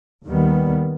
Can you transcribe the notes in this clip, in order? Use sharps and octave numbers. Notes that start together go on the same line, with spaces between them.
D#2 D#3 G3 B3